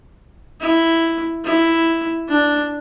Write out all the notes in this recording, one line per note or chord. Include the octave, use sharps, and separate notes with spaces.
E4
E4
D4